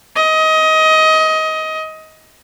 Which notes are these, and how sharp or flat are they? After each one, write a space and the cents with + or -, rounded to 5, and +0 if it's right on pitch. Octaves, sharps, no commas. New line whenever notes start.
D#5 +20